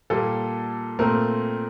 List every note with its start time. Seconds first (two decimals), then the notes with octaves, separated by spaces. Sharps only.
0.10 A#2 G3 A#3 A4
0.99 A#2 A3 C4 A#4